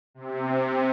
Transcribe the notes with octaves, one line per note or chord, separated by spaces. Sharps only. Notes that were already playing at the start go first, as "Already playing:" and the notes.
C3